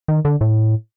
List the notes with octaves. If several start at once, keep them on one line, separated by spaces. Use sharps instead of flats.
D#3
D3
A2